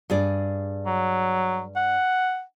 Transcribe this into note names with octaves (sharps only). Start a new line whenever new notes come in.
G2 G#4 D5
F#3
F#5